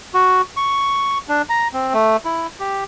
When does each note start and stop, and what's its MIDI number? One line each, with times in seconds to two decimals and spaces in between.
0.14 0.42 66
0.57 1.18 85
1.29 1.42 62
1.49 1.68 82
1.73 1.93 60
1.93 2.17 57
2.25 2.47 64
2.60 2.84 67